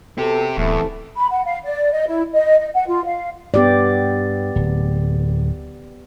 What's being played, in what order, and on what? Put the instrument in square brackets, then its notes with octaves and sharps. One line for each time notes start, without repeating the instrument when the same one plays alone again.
[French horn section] B3 F#4 A4 [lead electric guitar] C4 G4
[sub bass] D1 [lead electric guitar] E2 [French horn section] C3 E3 A3
[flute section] B5
F#5
F5
D5
D#5
E4
D#5
D#5
F#5
F4
F5
[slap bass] G2 [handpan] B3 G4 D5
[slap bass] D1